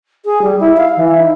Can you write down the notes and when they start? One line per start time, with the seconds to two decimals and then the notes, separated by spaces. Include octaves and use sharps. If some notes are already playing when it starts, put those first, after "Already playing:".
0.25 G#4
0.42 G3
0.59 E4
0.77 F5
0.96 E3
1.17 D#4